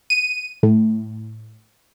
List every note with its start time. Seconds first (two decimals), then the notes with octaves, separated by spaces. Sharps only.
0.10 D#7
0.63 A2